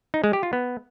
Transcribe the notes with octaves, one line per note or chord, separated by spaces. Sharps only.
D#4
G#3
G4
F4
B3